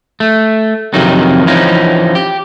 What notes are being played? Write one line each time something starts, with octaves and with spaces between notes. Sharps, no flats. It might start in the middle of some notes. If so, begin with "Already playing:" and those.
A3
F2 C3 D#3 F#3 D#4
E3 F3 C#4 D#4
G4